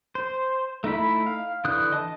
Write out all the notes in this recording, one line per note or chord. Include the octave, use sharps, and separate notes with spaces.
C5
A3 D#4 E4 B5
F5
D3 E3 D#6 F#6 G6
D#5 A5